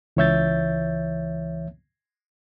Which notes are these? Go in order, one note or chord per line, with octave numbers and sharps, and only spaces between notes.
C#2 E3 C#5 E5 G6 A6